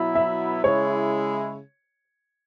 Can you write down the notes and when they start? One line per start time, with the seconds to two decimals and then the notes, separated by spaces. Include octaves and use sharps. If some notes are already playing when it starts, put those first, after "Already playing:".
Already playing: B2 F#3 B3 E4
0.15 E5
0.64 C#3 G#3 E4 C#5